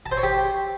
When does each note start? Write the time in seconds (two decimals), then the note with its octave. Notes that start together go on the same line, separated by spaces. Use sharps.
0.06 A5
0.12 C5
0.17 C#5
0.23 G4